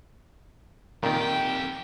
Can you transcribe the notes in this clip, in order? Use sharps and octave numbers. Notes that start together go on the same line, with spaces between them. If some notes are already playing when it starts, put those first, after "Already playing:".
F2 A#2 D#3 G4 G5